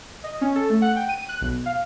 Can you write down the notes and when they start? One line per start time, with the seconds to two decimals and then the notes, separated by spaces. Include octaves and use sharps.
0.24 D#5
0.41 C#4
0.56 A4
0.70 A3
0.82 F#5
0.96 G5
1.09 D#7
1.29 F#6
1.41 B1
1.66 F5